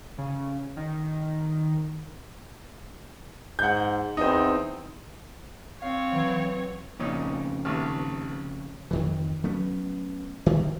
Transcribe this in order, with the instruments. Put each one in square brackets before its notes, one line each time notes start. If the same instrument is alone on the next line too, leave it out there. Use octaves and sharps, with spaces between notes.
[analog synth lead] C#3
D#3
[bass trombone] G#2 [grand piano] F#5 G6
[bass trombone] E2 [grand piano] C4 D#4
[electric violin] C4 C#5 [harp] F5
[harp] E3 F#3
[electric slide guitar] F2 C#3 [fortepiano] A#2 C#4 D#4
[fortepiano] A1 D#2
[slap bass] F2 D#3 E3
F#3 A3 B3 C#4
D1 C2 C3 D#3